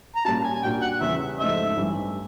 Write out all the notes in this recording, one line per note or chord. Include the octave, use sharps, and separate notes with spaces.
A#5
A#2 G3 A#3 C#4 F4 A5
G#5
G#5
A#2 G3 A#3 D4 F#4 G5
F#5
E2 C#3 E3 G3 E5
G#2 F3 A3 C4 D#4 E5
A1 G2 E3